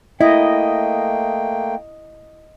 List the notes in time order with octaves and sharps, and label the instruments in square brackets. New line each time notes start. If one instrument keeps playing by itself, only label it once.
[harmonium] A3 A#3 G5 [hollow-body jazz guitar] E4 [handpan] D#5